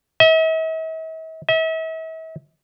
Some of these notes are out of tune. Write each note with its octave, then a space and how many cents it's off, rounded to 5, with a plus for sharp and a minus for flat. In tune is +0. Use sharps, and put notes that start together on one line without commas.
E5 -45
E5 -40